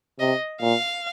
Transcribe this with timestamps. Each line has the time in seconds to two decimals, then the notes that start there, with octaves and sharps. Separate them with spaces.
0.20 C3 D#5
0.61 A#2 F5